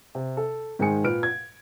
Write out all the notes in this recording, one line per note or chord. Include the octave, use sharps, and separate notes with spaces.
C3
A4
G#2 D#3 G#3 G#4 G#5 C#7
A#2 B4 F6 D7
G#6